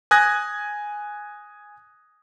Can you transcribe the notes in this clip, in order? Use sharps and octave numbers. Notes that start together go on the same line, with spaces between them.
G#5 D#6 F#6 G#6 A#6